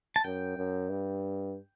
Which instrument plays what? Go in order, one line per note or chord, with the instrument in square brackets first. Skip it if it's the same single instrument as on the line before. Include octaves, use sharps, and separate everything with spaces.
[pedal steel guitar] A5
[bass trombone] F#2 [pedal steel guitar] G5
[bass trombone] F#2
G2